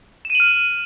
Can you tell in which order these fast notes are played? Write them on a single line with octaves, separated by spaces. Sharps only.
E7 D#7 F#7 F6